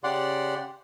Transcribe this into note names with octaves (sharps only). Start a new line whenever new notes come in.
C#3 G4 D5 F#5 C6